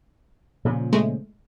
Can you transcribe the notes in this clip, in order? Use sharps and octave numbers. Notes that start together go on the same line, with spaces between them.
A#2 C#3 F3
G#3 A3